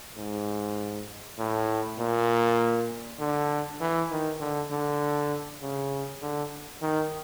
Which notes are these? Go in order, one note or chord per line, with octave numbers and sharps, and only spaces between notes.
G#2
A2
A#2
D3
E3
D#3
D3
D3
C#3
D3
D#3